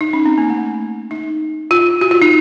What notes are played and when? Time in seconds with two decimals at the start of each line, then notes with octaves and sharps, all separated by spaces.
0.01 D#4
0.13 C#4
0.26 C4
0.38 A#3
0.50 A3
1.11 D#4
1.71 F4
2.01 F#4
2.11 F4
2.22 D#4